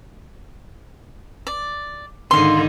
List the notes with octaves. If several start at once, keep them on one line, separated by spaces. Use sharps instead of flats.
D5
G#2 D3 D#3 F5 C6